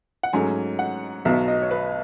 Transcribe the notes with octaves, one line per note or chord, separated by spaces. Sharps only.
F#5
G#2 F#3 A3 C#4 G#5
F#5
B1 B2 F#3 B3 E5
D#5
C#5
B4